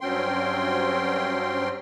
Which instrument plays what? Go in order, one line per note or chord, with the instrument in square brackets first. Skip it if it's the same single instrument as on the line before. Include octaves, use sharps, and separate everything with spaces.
[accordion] G2 F#3 C4 C#4 G5 C6